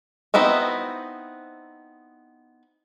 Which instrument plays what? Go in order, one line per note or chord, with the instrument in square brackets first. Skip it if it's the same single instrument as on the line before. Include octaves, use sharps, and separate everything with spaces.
[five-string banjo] B3 C4 D#4 E4 F#4